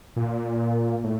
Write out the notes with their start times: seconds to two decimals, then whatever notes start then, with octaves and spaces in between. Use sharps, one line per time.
0.16 A#2
1.04 A2